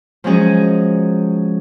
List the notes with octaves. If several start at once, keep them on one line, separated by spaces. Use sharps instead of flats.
F3 F#3 G#3 C#4 G#4